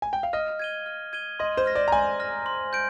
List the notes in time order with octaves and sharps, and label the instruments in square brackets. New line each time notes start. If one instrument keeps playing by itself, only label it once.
[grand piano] G#5
G5
F5
[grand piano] D#5 [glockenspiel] F6
[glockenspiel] G#6 D#7 G7
F6
G#6 D#7 G7
[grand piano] D#5 [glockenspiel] C6
[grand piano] C5
[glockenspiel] F6 A#6
[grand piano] D5
A#5
[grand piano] G#5 [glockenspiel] C6
[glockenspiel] F6 A#6
C6
G6 D7